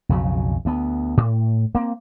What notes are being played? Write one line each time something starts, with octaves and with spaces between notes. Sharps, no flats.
B1 F2 C#3 F#3
D2 B3
A2
A#3 C4